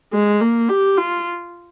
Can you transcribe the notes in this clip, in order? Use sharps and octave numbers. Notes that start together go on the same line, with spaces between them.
G#3
A#3
G4
F4